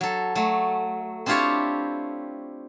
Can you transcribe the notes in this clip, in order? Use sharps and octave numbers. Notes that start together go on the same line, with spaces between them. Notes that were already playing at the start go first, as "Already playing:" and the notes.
F#3 A4
F#3 A3
C4 D4 E4 F4 G4 C#5